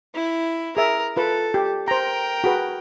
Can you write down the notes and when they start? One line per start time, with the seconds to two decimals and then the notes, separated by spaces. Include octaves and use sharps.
0.15 E4
0.77 G#4 A#4 E5
1.17 F4 A4 B4
1.54 G4
1.88 A#4 C5 G5 A#5
2.44 F#4 G#4 B4